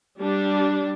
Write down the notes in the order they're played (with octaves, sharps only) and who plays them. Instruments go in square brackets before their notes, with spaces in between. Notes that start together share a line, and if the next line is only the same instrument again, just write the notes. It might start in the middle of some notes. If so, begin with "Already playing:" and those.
[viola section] G3 D4